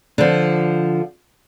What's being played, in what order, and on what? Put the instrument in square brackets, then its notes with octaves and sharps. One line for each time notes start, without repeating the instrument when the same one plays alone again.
[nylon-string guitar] D3 F3